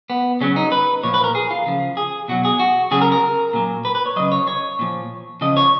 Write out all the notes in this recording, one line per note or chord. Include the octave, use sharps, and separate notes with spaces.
B3
C#3 F#3 C#4
D#4
B4
A#2 F3 C#5
B4
A#4
G#4
F4
C#3 F3
G#4
B2 F#3 F#4
G#4
F#4
C#3 F#3 G#4
A#4
A#4
A#2 F#3
B4
B4
C#5
C#3 F#3 D#5
C#5
C#5
A#2 F3
C#3 F3 D#5
C#5